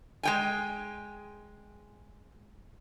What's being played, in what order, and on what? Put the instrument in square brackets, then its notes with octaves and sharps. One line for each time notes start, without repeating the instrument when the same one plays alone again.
[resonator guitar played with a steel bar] G#3 G5 G#5